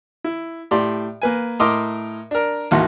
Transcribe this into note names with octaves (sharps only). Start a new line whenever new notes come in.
E4
A2 G4 D5 C6
A#3 B4 G#5
A2 A#4 D#5 C6 D6
D4 A#4
A1 D#2 F#4 C6